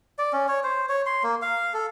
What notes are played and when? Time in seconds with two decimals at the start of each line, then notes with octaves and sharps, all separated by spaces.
0.19 D5
0.33 C#4
0.48 C#5
0.64 C5
0.89 C#5
1.06 C6
1.23 A#3
1.42 F5
1.74 A4